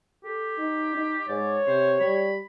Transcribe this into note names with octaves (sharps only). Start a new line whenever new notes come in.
G4 A4
D#4
D#4
G#2 C#5 D5
C3 C5
G3 B5